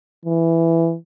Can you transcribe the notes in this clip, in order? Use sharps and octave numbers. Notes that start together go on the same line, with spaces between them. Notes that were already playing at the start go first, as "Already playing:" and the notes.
E3